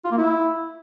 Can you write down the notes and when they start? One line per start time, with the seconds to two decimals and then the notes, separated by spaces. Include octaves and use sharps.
0.05 F4
0.11 A#3
0.18 E4